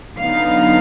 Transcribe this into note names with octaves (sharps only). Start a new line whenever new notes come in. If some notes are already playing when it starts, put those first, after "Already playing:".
D3 F#3 B3 D#4 F5